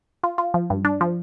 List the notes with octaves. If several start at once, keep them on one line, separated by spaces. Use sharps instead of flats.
F4
F4
F3
G2
D4
F3